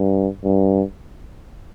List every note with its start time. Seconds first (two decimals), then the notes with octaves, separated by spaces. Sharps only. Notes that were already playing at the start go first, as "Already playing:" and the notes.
Already playing: G2
0.44 G2